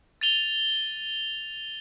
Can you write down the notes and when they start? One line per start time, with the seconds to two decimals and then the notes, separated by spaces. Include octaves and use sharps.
0.21 A6 D#7 F7 G7